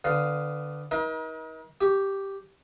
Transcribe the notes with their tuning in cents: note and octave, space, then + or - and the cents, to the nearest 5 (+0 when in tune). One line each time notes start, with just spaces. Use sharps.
D3 +10 B3 +20 F5 +0
D#4 +35 A#4 +45
G4 +0 C#6 +30